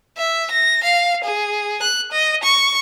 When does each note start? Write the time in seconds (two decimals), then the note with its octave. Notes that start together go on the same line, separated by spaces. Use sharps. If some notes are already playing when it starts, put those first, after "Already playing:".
0.18 E5
0.51 A#6
0.84 F5
1.24 G#4
1.82 F#6
2.12 D#5
2.43 C#6